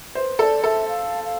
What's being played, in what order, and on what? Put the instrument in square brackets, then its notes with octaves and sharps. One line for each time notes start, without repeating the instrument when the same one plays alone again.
[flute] B4 [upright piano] C5
[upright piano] A4 [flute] D5
[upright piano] A4 [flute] E5
[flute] F5
F5